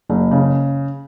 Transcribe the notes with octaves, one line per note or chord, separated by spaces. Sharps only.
F#1
C#3